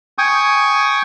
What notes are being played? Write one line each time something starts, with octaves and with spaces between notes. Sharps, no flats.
G5 G#5 C#6 D#6